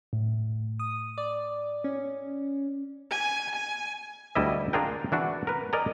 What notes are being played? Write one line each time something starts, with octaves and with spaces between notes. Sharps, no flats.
A2
D#6
D5
C#4
G#5
G#5
D2 G3 E4 D#5 E5
D4 F4 G#4 A#4 G5
E3 D4 F#4
A#4 B4
A#4 D5 D#5 G#5 A#5